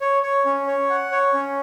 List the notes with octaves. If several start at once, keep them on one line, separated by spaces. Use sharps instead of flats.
C#5
C#5
C#4
C#5
F#5
C#5
C#4